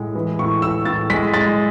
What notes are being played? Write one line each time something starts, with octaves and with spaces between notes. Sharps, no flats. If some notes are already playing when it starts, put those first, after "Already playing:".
Already playing: A2 G#3
E3
A2 C#6
E3 E6
A2 A6
G#3 B6
G#3 A6